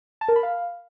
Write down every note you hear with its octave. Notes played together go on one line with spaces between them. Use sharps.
A5
A#4
B5
F5